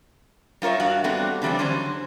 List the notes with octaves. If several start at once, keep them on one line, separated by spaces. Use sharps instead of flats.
G3 F4 A#4 C#5 E5
G2 F#4 F5
G3 A3 B3 C4 D4 F#4
C#3 E3 G3 C4 D4
D3 F#3 C#4 C5